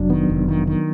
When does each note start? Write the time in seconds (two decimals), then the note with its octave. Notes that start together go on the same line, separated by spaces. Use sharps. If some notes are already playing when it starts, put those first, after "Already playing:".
Already playing: F1 F#3 D4
0.10 D#3 B3
0.30 F1
0.48 D#3
0.67 D#3